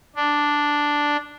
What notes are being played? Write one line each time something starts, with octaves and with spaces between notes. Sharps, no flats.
D4